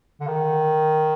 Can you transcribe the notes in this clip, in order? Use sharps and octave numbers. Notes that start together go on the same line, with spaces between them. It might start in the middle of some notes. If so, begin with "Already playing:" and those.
D3
D#3